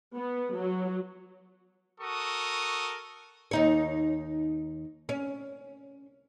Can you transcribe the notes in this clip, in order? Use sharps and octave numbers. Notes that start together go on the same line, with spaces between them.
B3
F#3
F#4 A4 A#4 C#6 D#6
D#2 D#4 C#5
C#4